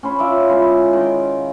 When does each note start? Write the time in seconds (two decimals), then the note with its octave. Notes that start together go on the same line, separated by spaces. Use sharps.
0.03 C#4 C5 B5
0.19 F4 D5 E5
0.48 G#3 C#4 E4 F4
0.93 D#3 G5